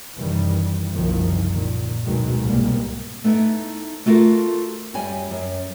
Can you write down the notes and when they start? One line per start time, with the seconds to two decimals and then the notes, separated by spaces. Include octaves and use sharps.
0.16 F#2 C3 D#3 E3 G3
0.93 F#1 C2 F#2 D#3 F3
1.52 A#2 D#3
2.04 D2 B2 D#3 F#3 G#3
2.41 C2 G#2 B2 G3 G#3 A#3
3.24 A3 B3 D#4 E4 E5
4.06 A3 F4 F#4 A4 A#4
4.94 F#2 G3 G#5
5.31 F#2